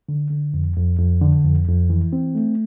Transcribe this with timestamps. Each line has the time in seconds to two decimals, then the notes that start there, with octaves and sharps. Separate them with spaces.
0.09 D3
0.31 D3
0.54 F2
0.76 F2
0.99 F2
1.22 D3
1.44 F2
1.68 F2
1.90 E3
2.13 C4
2.35 A3